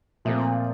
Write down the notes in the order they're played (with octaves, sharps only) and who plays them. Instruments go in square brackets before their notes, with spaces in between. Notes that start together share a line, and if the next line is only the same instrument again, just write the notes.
[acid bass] A#2 [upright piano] F3 A3 C4 F4